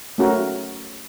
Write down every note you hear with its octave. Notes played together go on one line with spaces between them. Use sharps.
A3 C#4 F#4 A#4